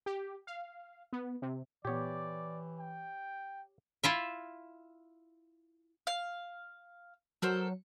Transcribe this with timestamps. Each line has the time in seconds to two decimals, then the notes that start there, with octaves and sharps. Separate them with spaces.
0.06 G4
0.47 F5
1.13 B3
1.42 C3
1.85 A#2 E3 B3 G4 C#5 D5
2.80 G5
4.04 E4 F4 E5
6.07 F5
7.42 F#3 A4 A#4 C5